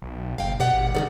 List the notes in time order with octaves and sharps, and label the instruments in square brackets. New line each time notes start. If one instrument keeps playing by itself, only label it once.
[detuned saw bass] B1
[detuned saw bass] F#1 [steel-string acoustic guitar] F5 G5
[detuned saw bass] B2 [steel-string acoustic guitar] G4 D5 F#5
[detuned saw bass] G#1
[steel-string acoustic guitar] D3 A4 D5 [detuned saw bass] D#3